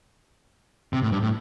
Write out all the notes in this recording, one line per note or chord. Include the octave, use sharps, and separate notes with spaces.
C3
A2
G2
A2